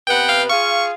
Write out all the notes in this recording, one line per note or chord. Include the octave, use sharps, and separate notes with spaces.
C3 B3 B4 F#5 G5
F5 G5
F4 G#4 F5 C#6